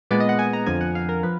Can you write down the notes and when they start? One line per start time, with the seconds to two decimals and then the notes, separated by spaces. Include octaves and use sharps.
0.11 A#2 G#3 B3 D5
0.20 D#5
0.29 F#5
0.39 G#5
0.53 A#5
0.66 F2 D3 F3 G#5
0.81 F#5
0.95 F5
1.09 A#4
1.23 F3 B4